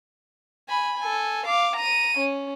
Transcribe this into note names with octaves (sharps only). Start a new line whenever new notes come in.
G#5 B5
A4 G#5
F5 D6
A#5 D#7
C#4